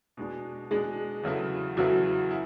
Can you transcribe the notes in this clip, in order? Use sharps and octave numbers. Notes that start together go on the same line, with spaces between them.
B2 G#3 D4
B2 G#3 D4 G#4
E2 C#3 F#3 A3 E4
E2 C#3 F#3 A3 E4 F#4
E4